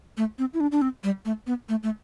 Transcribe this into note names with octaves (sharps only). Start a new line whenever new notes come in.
A3
C4
E4
D4
D4
C4
G3
A3
B3
A3
A3